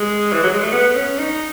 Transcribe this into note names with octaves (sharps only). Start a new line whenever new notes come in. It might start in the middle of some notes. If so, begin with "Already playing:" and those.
Already playing: G#3
E3
F#3
G#3
A3
B3
C#4
D#4